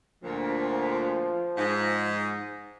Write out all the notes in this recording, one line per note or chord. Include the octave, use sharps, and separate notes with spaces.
D2 A#2 F3
G#2